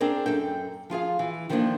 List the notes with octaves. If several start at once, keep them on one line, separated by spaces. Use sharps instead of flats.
C4 D4 G#4 A#4 D5
F#2 A4 G5
F3 F4 G#4 F5
E3
D#3 F3 A3 A#3 C#4 D4